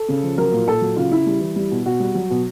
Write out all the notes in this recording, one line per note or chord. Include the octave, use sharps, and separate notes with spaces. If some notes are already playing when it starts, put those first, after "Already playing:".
Already playing: A4
C#3
F3
F#3 A#4
A#2
A#2 A4
F#3
C#3 F4
C#3 E4
G3
E3
G3
B2
B2 F#4
G3
F#3
B2